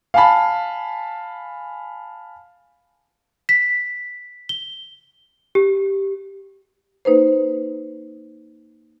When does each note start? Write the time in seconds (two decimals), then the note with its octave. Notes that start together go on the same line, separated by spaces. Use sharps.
0.14 F5 G#5 A5 B5
3.49 B6
4.49 G7
5.55 G4
7.05 A#3 D#4 B4 C5